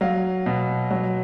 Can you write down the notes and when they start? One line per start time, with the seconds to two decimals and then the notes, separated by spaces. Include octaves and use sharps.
0.01 F#3 F5
0.46 B2
0.91 F#3